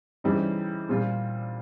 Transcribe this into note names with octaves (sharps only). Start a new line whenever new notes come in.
C#3 E3 G3 C4 D#4
A#2 G3 C4 F4